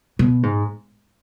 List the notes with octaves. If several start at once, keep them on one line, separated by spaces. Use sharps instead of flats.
B2
G#2